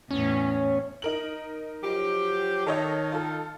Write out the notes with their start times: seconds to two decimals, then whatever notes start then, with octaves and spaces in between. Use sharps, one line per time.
0.11 E2 A2 C#4
1.02 D#4 A#4 F#7
1.83 F3 F#3 G4
2.66 D#3 A4 C#5 D#5
3.12 F4 A4